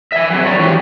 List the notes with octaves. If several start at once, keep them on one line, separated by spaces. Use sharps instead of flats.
E5 G#5
F#3 C4
G3 C#5
E3 G4